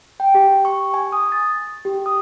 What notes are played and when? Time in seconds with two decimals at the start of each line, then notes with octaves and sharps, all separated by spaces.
0.20 G5
0.34 G4
0.65 C#6
0.94 G#5
1.12 D#6
1.32 A6
1.85 G4
2.06 D#6